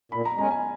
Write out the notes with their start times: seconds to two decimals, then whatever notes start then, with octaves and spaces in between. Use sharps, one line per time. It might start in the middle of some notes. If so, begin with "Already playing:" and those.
0.12 A#2 B5
0.25 A#5
0.37 G#3 C#4 A#5
0.51 G#5